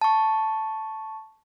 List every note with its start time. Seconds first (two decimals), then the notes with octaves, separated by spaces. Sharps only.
0.01 A5 C#6